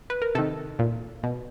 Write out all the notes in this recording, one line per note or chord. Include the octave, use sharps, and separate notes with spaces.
B4
A#4
C3 D#3 A4
A#2
B2